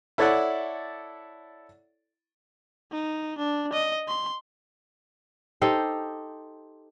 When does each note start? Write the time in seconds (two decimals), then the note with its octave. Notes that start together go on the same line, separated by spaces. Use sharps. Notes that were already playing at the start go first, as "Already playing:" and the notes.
0.18 E4 A4 C#5 D5 E5 F#5
2.91 D#4
3.38 D4
3.73 D#5
4.08 C6
5.61 D#4 G4 A4 C5